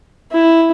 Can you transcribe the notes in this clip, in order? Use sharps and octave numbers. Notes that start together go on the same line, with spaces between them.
E4